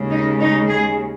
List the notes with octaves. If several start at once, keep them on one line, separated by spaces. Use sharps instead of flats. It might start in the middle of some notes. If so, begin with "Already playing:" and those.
Already playing: D#2 C#3 G#3
D#4
D#4
G#4